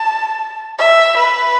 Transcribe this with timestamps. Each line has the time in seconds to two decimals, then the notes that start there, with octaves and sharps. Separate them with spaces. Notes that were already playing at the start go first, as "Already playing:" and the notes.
Already playing: A5
0.79 E5
1.18 B4